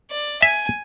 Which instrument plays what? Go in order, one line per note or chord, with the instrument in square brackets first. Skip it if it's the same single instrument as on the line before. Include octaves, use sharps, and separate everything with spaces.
[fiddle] D5
[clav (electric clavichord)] E5 [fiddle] G#5